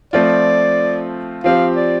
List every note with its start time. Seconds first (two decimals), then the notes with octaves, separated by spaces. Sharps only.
0.13 F3 A3 C4 F4 D5
1.44 F3 C4 G4 F5
1.76 D5